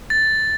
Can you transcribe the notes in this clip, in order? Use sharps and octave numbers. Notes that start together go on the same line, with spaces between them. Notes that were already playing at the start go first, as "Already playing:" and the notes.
A6